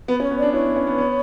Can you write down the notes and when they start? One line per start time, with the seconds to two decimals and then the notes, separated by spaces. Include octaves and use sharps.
0.08 B3 B4
0.20 C#4 B4
0.23 C#5
0.31 B3
0.38 D4 D5
0.53 E4 C#5
0.67 B3
0.76 C#4
0.87 B3
0.98 B3